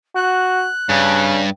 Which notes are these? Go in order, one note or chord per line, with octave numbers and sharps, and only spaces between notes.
F#4 F#6
G2 C#3